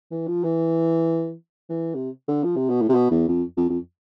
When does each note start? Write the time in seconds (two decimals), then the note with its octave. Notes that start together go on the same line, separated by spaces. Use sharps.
0.11 E3
0.27 F3
0.44 E3
1.69 E3
1.94 C3
2.28 D3
2.44 F3
2.56 C3
2.69 B2
2.81 A2
2.89 C3
2.94 B2
3.11 E2
3.28 F2
3.57 F2
3.69 F2